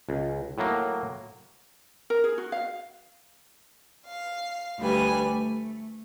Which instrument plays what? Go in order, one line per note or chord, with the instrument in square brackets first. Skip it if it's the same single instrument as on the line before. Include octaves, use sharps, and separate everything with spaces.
[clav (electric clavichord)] C#2
A2 F#3 A#3
[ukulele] A#4
G#4
F#4
F5
[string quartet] F5
D2 G3 B4 G#5
A3